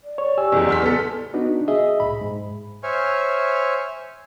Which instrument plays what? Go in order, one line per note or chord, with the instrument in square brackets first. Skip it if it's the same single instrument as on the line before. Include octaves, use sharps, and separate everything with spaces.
[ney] D5
[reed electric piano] C#5
G4 G#5 E6
[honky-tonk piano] F#1 E2
C6 F6 B6
B3 A4
[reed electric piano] B3 D4 D#4 F#4
G#4 D#5 E5
C2 A2 B5
G#2
[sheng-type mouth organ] C5 C#5 E5 G#5 C#6 F6